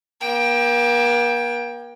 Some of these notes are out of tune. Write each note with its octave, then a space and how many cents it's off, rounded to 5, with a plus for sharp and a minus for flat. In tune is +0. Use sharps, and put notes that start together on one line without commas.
A#3 +40 G5 +15